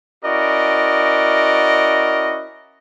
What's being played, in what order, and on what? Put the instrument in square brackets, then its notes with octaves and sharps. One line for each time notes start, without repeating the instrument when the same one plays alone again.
[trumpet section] C#4 E4 F#4 A#4 D5 D#5